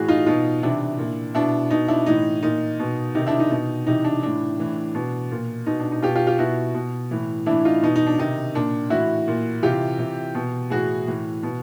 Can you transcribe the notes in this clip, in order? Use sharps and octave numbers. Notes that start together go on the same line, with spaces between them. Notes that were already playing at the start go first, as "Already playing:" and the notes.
Already playing: A2 E3 F#4 G#4
D#4 F4
B2 D#4 F4
C3 E3 D4 E4
A#2
B2 D4 E4
B2 D#4
D4 E4
A2 E3 D#4
A#2 D#4
B2
C3 D#3 D#4
D4 E4
D#4
B2
C3 E3 D#4
D4
A2 E3 D4
A2 E3
B2
A#2
B2 D#4
D4
D#4
B2 F4 G4
F4 G4
F4 G4
B2 E4 F#4
B2
A2 E3
A2 E3 D4 E4
D#4 F4
B2 D#4
D#4
D4
C3 D#3 D#4
A#2 D4
A2 E3 E4 F#4
A#2
C3 E3 F4 G4
C3 E3
B2
A2 E3 F#4 G#4
A2 E3
B2